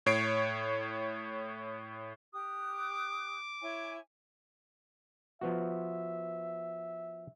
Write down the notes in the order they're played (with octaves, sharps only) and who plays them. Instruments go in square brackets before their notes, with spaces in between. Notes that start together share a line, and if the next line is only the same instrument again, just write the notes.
[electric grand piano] A2 C#5 C7 D7
[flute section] G4 D#6 F#6
[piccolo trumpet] D6
[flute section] E4 C#5 G#5
[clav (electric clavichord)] F3 B3 F#4 [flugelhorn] E5